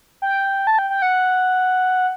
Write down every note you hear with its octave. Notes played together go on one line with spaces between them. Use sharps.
G5
A5
G5
G5
F#5